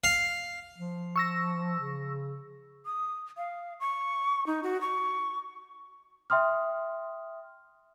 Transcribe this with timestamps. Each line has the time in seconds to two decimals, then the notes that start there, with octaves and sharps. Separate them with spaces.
0.04 F5
0.78 F3
1.16 C#6 E6 A#6
1.80 C#3
2.86 D#6
3.37 F5
3.80 C#6
4.47 D#4
4.63 F#4
4.81 C#6
6.30 E5 G5 C6 D#6 F6